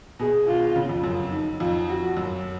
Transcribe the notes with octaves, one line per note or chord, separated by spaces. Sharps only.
B2 G#4
F4
C#3
F2
F#2
D#4
F2 F4
F#4
F#2